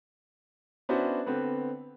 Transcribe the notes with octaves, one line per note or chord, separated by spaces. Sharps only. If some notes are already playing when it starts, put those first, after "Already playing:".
B3 C#4 D4 E4 F#4 C5
D3 B3 C4 B4